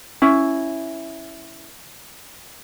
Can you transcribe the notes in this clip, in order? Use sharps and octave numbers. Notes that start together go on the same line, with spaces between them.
C#4 E4